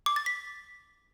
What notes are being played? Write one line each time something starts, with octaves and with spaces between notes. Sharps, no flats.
D6
A6
B6